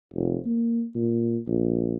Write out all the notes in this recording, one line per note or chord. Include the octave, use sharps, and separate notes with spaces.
F1
A#3
A#2
A#1